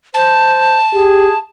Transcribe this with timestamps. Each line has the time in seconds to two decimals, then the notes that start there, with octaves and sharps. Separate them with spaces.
0.14 C5 A5
0.94 G4 G#4